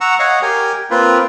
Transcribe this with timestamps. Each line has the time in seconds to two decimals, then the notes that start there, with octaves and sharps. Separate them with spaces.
0.01 F#5 A#5 C#6 E6
0.19 C#5 D#5 F5 F#5
0.42 G4 A#4 G#5
0.91 A#3 C4 F4 B4